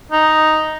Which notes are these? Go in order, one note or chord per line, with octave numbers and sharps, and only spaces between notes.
D#4